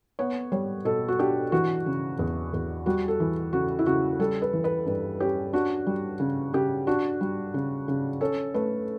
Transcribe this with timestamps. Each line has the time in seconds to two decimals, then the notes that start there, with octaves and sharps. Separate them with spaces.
0.19 B3 C#5
0.52 G3 C#5
0.85 B2 A4
1.08 F#4
1.19 D4 G4
1.52 E3 F#4
1.86 C#3
2.19 E2
2.53 E2
2.86 G3 F#4
3.08 A4
3.20 E3
3.53 C#3 F#4
3.79 E4
3.86 C#3 F#4
4.19 G3 A4
4.42 B4
4.53 E3
4.64 B4
4.86 G2
5.20 C#4 G4
5.53 D4 F#4
5.87 G3
6.20 C#3
6.53 C#3 G4
6.87 D4 F#4
7.21 G3
7.54 C#3
7.88 C#3
8.21 C#4 A4
8.54 A3 B4